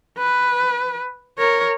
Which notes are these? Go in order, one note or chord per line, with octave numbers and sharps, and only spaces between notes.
B4
A#4 C#5